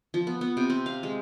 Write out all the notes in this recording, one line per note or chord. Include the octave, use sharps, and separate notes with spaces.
F3
B3
B3
C3
C4
F5
G#3